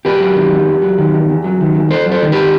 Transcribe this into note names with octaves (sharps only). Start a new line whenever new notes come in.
E2 G4 B4
F#3
D#3
E2
E2
F#3
D#3
E2
E2
F#3
D#3
E2
E2 A4 C5
F#3
A4 C5
D#3
G4 B4